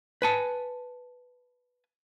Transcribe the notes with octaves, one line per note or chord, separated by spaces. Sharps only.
B4 G#5 A5